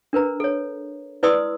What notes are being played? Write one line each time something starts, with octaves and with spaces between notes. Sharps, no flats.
D4 A#4 B4 A#5
A4 C#5
E4 B4 D5 C6 D#6 E6